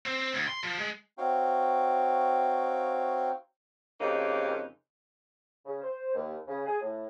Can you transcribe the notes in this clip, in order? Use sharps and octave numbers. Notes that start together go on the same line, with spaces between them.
C4
C4
D2
C6
F3
G#3
C4 D#4 F#4 C#5 F5 G5
F2 C#3 A#3 D#4 G4
C#3
C5
D#2
C#3
G#4
A2